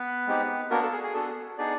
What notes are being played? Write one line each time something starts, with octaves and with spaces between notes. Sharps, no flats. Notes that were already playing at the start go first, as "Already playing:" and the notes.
Already playing: B3 B4
G#3 C4 D#4 G4
A#3 B3 D4 F#4 A#4
A4
G#4
G#4
B3 D4 F#4 A4
B3 D4 D#4 G#4 D5